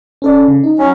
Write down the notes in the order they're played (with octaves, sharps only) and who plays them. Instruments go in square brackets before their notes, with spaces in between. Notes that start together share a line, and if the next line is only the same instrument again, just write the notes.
[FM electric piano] C#4 A4 D5
C#3
D#4
[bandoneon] F#3 C#4